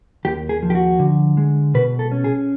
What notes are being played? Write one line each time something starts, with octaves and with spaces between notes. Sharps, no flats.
D#2 G4
G#4
F3
G4
F#4
D3
G#3
B2 B4
A4
C#4
G#4